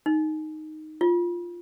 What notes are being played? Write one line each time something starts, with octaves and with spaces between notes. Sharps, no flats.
D#4
F4